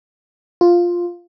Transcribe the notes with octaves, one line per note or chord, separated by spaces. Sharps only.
F4